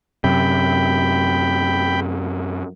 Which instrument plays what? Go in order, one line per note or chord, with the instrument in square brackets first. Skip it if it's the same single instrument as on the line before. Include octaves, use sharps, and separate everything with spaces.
[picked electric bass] F#2 C3 [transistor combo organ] G5 B5